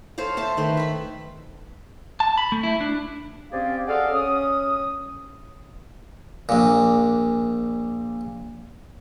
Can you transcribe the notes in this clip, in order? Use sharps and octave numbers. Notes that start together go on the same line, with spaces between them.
A4 C5 C#5 F5
C5 E5 A5
D#3 A3 B4 C6
E5 B5
A5
B5
A3
E4
D4
C4 C#4 G4 G#4 D5 F5
G#4 A4 D5 D#5 F5 F#5
C#4 D#6
A#1 A#2